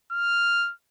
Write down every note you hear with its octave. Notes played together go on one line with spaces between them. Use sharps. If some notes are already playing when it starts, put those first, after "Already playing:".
F6